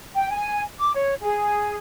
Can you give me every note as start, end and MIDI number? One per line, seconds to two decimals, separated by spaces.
0.15 0.28 79
0.32 0.61 80
0.80 0.91 86
0.95 1.14 73
1.22 1.76 68